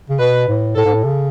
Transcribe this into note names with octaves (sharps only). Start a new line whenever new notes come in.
C#3
B2 B4
A2
A2 A4
G#2
A2
C#3